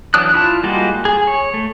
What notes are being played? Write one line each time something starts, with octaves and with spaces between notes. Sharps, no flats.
E3 F#3 D4 D#6 F#6
E4 F4 A5
G3 G#3 A#3 F4 F#4
G#4
C#5
A3